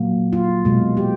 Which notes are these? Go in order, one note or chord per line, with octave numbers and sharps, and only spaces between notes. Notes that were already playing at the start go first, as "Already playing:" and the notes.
Already playing: A#2 F#3 A#3
F4
B2 G#3
G4